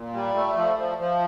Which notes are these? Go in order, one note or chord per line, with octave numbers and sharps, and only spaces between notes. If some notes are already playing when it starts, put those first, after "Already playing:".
Already playing: A#2
G3
A3
F3
F3
F3